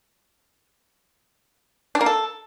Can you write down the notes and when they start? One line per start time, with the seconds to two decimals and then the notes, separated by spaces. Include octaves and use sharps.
1.95 D4
2.01 A#3
2.06 A4